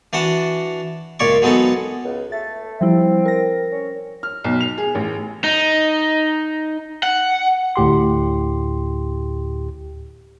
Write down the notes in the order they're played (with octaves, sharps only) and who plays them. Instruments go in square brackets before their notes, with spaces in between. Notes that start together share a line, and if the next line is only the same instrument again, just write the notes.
[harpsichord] E3 D4 F#4 F#5 A5
C#2 A#2 C#5 D5 C#6
F#3 G#3 B3 D#4 A4
[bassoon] C#2
[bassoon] A3 [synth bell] A6
[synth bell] F3 G3 E4 [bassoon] C4
[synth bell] A#4 A#6
[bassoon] C#4
[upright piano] F6
B1
F7
G#4
A1
[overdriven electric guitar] D#4
F#5
[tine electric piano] D2 A2 G4 C6